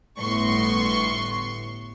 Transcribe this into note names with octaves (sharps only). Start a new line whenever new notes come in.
G1 A2 B3 C6 C#6